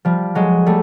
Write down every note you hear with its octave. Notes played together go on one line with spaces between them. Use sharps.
F3 G3
F#3 G#3
G3 A3